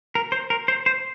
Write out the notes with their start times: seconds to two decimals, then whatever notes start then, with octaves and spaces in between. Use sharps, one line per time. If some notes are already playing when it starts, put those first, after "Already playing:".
0.15 A#4
0.32 C5
0.50 A#4
0.68 C5
0.86 C5